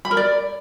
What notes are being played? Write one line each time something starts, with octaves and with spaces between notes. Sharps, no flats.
B5
A#4
D5